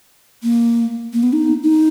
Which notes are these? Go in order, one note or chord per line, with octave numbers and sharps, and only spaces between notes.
A#3
A#3
B3
D#4
D#4